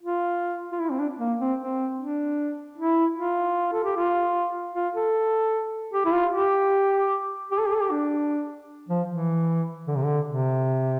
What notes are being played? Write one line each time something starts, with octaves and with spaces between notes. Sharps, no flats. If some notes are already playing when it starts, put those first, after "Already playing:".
F4
F4
E4
C4
D4
A#3
C4
C4
D4
E4
F4
A4
G4
F4
F4
A4
G4
E4
F4
G4
G4
A4
G4
A4
G4
D4
F3
E3
D3
C3
D3
C3